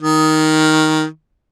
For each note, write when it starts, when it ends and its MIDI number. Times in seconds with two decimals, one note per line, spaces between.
0.02 1.05 51